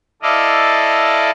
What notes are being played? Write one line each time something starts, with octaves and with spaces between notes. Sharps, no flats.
E4 A4 D5 D#5 F5